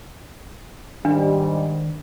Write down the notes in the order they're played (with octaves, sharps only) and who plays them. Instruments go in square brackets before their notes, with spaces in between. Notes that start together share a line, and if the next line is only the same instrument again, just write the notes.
[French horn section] G#2 G3 [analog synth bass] D#3 [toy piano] D4